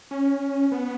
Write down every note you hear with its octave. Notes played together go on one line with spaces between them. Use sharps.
C#4
B3